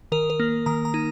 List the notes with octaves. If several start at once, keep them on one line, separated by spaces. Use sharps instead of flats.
D#3 A#4
A#4
A#3
D#3 A#5
A#5
D#4